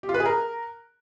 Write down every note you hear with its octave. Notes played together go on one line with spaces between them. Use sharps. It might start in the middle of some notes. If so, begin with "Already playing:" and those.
G4
F4
B4
G#4
A#4